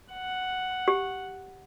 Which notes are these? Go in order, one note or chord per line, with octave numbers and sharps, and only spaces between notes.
F#5
G4